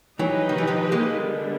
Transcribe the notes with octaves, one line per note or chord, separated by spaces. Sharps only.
E3 F#3 D#4 G4 B4 D#5
D#3
E3
D#3 F3
G#3 A#3
D3 G3 B3 D4